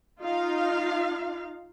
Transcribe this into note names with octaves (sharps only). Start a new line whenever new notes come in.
D#4 F4 F5